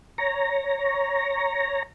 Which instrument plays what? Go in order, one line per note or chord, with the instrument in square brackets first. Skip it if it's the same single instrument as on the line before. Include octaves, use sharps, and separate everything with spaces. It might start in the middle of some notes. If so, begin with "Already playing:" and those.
[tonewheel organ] C#5 A#5